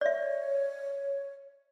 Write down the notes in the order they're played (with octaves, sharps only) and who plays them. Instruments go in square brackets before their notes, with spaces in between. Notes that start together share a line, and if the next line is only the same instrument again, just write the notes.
[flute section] C#5 [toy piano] D5 E5